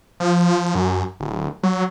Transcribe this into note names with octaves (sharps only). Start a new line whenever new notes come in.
F3
F#2
D1
F#3